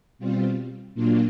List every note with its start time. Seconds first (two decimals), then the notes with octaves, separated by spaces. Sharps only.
0.19 B2 G3 C4 F4
0.94 A#2 F#3 A#3 D4 F4